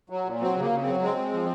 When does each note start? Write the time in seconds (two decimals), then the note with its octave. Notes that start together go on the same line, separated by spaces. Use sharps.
0.10 F#3
0.25 A#2
0.41 F#3 C4
0.55 C#3
0.62 A#3
0.71 C#3
0.82 F#3 C4
1.02 G#3 C4
1.17 G#3
1.33 F3